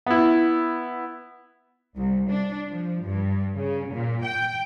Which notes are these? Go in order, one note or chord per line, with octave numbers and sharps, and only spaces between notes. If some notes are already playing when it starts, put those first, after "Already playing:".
B3 E4
C2
D4
F3
G2
C#3
A#2
G5